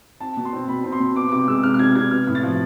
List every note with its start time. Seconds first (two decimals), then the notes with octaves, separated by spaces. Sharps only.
0.20 C4 A5
0.37 B2
0.45 C6
0.53 C4
0.68 B2 B5
0.84 C4
0.92 C6
1.00 B2
1.15 B3 D6
1.31 C3 D6
1.47 G#3 E6
1.63 C3 F6
1.74 F6
1.79 C3 G#6
1.95 C3 G#6
2.11 B3 F6
2.27 A2
2.35 A6
2.44 F3